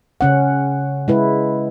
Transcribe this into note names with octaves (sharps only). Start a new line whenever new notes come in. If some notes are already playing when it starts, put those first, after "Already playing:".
C#3 C#4 F#5
G#3 E4 B4